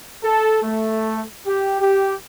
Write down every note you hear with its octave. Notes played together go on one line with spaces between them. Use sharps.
A4
A3
G4
G4